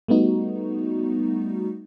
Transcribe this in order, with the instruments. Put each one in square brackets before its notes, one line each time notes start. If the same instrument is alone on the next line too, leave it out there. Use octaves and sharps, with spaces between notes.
[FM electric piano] G3 A3 B3 D#4 F#4